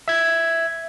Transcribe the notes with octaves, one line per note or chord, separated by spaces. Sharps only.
E5 G#6